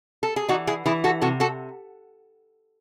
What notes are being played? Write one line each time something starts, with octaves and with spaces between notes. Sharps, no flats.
A4
G#4
E3 D#4 F#4
E4 G#4
E3 E4 G#4
F#4 A4
C3 F#4 A4
F#4 A4